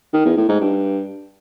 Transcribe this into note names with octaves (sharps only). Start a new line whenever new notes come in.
D#3
E2
A2
G#2
G2